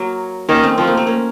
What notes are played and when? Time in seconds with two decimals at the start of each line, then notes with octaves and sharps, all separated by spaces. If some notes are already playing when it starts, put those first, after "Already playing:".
Already playing: F#3 A#3
0.49 D#3 A#3 C#4
0.63 A3 C4
0.78 F3 A3 C4
0.87 A#3
0.97 A3 C4
1.07 A#3 C#4